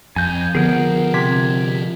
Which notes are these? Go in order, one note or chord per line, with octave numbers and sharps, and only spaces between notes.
F2 G#5 G6
D3 F3 B3 G#4 A#4 F#5
C3 G#6 B6